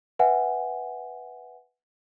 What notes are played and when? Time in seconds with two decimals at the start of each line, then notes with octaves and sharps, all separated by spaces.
0.19 B4 E5 F#5 G#5